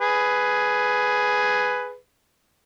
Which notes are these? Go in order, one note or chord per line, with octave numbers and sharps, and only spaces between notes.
G#4 B4